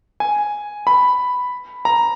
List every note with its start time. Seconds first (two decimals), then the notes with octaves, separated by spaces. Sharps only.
0.20 G#5
0.87 B5
1.85 A#5